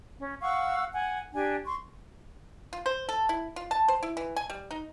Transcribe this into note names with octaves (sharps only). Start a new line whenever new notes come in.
C#4
F5 F#5 C#6 E6
F#5 G#5
D4 G4 G#5
C6 C#6
F4
C5
A4
E4
F4
A5
C5
E4
E3
G#5
G3
D#4